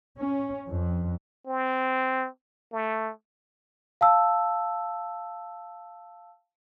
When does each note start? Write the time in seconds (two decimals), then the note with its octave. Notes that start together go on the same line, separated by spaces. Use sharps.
0.17 C#4
0.69 F2
1.47 C4
2.72 A3
4.01 F5 A5 E6